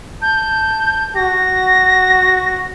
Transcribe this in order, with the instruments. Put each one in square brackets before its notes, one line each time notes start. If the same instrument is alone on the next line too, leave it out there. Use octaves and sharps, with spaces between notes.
[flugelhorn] A5 [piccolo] G6
[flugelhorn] F#4 [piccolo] A#6